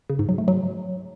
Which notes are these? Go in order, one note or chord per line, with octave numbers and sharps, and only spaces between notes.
C#3
G#2
F#3
A3
F#3